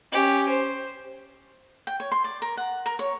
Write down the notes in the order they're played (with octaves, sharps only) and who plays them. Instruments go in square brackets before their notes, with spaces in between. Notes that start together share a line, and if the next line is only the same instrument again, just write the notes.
[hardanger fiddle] C#4 G4
C5
[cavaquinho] G5
C#5
C6
D5
A#4
F#5
A#4
C#5